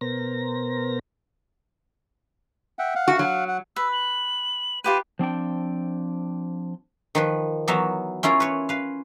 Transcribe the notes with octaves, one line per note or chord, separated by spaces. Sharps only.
B2 B3 A#4 C5 A#6
E5 F#5 G5
F5 F#5
F#4
F#3
F#5
B4 E6
F#7
F4 G4 B4 D#7
F3 C4 D4 G5
D#3 F3 B4
E3 F#3 B3 E5 A#5
C#4 E4 F4 A#4
B4 C#5
B4 F5